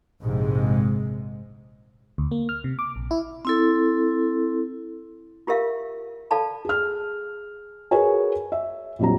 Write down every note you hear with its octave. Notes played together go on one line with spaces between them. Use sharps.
A#1 G#2 C3 G#3
D2
A#3
F6
C3
D6
A#1
E4
C4 E4 A4
F4 G4 A#4 E5 F5
A4 D5 F5 A5 B5
G#4 F6
F#4 G#4 A#4 B4 C#5 G#5
E5
A#1 F2 F#3 G3 A#5